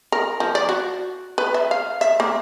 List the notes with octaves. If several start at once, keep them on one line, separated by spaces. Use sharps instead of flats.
A#4
F3
D5
F#4
B4
E5
F5
E5
A#3